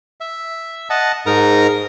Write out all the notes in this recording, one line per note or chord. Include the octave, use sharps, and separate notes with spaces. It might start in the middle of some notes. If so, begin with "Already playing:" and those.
E5
D#5 F#5 A5
G#2 D#4 A#4 A#5